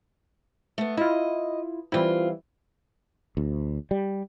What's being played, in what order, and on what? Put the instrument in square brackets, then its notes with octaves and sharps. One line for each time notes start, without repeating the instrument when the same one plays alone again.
[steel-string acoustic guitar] A3 B3
[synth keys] E4 F4 [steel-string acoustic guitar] D#5
[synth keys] E3 G3 E4 [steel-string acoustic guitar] C4 F4
[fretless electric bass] D2
G3